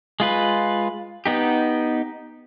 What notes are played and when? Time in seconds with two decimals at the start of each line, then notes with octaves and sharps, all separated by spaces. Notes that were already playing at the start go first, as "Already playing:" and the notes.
0.20 G#3 F4 B4
1.26 B3 D#4 G4